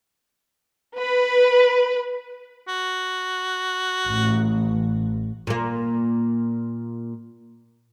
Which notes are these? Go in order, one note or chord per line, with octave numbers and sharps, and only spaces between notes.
B4
F#4
A1
A#2 A#3